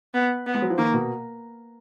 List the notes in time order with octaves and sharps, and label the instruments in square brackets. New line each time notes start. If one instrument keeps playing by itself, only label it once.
[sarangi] B3
B3
[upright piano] G#3
F#3
F3
[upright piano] D#3 [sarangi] A#3
[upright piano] B2